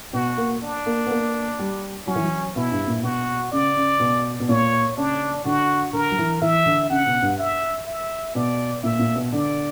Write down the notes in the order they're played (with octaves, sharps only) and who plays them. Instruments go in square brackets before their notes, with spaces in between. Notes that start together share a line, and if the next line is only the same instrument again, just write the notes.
[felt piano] B2 [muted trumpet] F#4
[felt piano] A#3
[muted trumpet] D4
[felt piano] A#3
B3
A#3
G3
[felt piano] F#3 [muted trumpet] C#4
[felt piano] E3
F#3
[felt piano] B2 [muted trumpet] E4
[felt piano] G2
A#2
[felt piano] B2 [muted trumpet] F#4
[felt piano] C#3 [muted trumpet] D5
[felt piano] C#3
B2
B2
[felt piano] A#2 [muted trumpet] C#5
[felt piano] C#3 [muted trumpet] D4
[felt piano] D3 [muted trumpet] F#4
[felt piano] D3 [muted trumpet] A#4
[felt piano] F#3
E3
[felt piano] E3 [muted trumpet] E5
[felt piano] D3
[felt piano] C#3 [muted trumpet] F#5
[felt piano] B2
G2
[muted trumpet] E5
E5
[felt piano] B2 [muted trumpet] D5
[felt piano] A#2 [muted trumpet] E5
[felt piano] A#2
B2
[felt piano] D3 [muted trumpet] D5